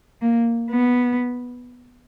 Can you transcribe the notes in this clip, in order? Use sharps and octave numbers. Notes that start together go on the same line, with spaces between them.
A#3
B3